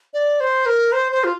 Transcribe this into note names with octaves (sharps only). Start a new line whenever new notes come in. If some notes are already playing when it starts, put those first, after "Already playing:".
D5
C5
A#4
C5
C5
F4